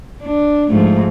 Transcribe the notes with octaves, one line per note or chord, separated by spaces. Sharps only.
D4
G#2 F3 A3